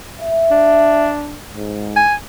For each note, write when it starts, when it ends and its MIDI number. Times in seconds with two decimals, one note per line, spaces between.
0.20 1.09 76
0.51 1.40 62
1.54 2.01 44
1.96 2.15 80